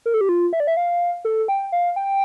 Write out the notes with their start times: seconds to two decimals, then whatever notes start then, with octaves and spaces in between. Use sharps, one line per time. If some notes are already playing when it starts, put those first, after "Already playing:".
0.06 A#4
0.14 A4
0.21 G4
0.29 F4
0.53 E5
0.60 D5
0.67 E5
0.77 F5
1.25 A4
1.48 G5
1.72 F5
1.96 G5